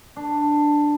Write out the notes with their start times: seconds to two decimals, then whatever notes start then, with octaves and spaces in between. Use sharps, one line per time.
0.16 D4